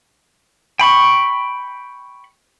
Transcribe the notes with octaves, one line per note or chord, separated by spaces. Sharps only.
G5 B5 C#6